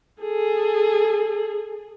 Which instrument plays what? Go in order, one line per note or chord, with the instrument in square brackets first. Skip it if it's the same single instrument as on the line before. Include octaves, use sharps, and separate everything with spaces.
[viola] G#4 A4